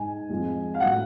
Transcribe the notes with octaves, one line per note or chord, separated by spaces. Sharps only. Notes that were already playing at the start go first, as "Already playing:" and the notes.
Already playing: G#2 G#3 G#5
F2 F3 G#3
F5
A2 F#3 F#5